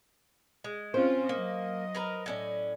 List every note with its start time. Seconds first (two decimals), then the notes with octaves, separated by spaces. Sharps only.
0.64 G#3
0.94 C4 C#4 F4 C5
1.29 F#3 A#3 D#5
1.95 A#4 B4 A#5
2.26 A2 C#4 D5